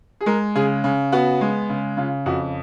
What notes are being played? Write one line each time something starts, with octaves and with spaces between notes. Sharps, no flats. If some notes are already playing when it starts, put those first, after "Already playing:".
G#4
G#3 A#4
C#3 G#4
C#3
B3 F#4
G#3
C#3
C#3 F4
F2 F#4